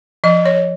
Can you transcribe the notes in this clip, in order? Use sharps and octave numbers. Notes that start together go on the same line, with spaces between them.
F3 D#5
C#5